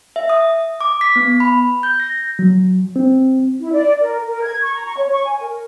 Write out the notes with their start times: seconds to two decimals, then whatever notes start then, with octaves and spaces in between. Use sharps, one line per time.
0.16 E5
0.30 D#6
0.81 D6
1.01 B6
1.16 B3
1.40 B5
1.83 G6
2.00 A#6
2.39 F#3
2.96 C4
3.60 E4
3.73 D5
4.01 A#4
4.26 A#4
4.44 G#6
4.62 C#6
4.74 A#5
4.86 C#6
4.97 C#5
5.12 C#6
5.25 G#5
5.40 A#4